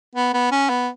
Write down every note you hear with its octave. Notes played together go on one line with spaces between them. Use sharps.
B3
B3
C#4
B3